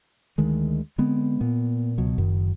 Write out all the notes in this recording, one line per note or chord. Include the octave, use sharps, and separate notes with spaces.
D2 D#3 G#3
D3 G#3 B3 C4
A#2 B3
C#2 B2 F#3
F#1 F#2 D#3